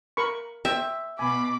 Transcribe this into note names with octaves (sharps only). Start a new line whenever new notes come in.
A#4 B5 C#6
C5 E5 G5
B2 G#5 B5 D6